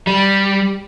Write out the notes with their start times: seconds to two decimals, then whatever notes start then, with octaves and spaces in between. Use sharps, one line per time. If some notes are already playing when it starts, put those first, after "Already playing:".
0.07 G3